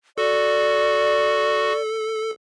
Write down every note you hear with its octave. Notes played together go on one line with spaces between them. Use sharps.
F#4 A4 D5